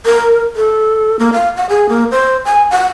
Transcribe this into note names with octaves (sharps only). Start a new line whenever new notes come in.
A#4
A4
A#3
F5
F#5
G#4
A#3
C5
G#5
F#5